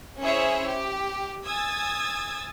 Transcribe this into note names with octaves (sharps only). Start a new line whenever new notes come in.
C#4 E4 G#4 C5 C#5 E5
G4
G#5 D#6 E6 G#6 A6